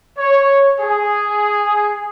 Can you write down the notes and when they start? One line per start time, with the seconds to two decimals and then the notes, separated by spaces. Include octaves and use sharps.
0.16 C#5
0.80 G#4